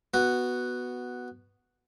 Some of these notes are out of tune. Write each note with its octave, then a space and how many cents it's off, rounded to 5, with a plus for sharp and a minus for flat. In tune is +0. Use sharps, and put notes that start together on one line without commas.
B3 +0 F#4 +0